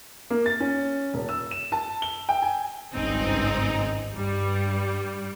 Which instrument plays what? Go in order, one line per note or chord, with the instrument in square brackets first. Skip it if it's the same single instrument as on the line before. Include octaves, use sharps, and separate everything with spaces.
[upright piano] A#3
A6
C#4
D#1
E6
E7
A5
G7
G5
G#5
[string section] G#1 C#2 G2 C4 D#4 G#4
G2 G3